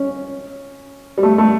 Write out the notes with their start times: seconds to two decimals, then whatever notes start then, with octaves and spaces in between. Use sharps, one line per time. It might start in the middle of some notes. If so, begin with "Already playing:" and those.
Already playing: C#4
1.18 G3
1.23 A3
1.38 A3